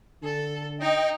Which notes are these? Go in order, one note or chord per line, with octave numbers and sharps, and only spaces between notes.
D3 A4
D#4 D#5 G5